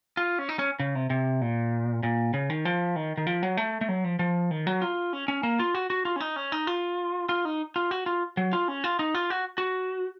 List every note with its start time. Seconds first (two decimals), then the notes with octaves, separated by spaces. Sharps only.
0.17 F4
0.39 C#4
0.49 D#4
0.59 C#4
0.80 C#3
0.95 C3
1.10 C3
1.41 A#2
2.03 A#2
2.34 C#3
2.50 D#3
2.65 F3
2.96 D#3
3.17 D#3
3.27 F3
3.43 F#3
3.57 A3
3.81 A3
3.89 F#3
4.04 F3
4.19 F3
4.51 D#3
4.67 F#3
4.82 F4
5.13 C#4
5.28 C#4
5.43 A#3
5.59 F4
5.74 F#4
5.90 F#4
6.05 F4
6.16 C#4
6.20 D#4
6.36 C#4
6.52 D#4
6.67 F4
7.29 F4
7.45 D#4
7.76 F4
7.91 F#4
8.06 F4
8.37 F#3
8.53 F4
8.68 C#4
8.84 F4
8.99 D#4
9.15 F4
9.30 F#4
9.58 F#4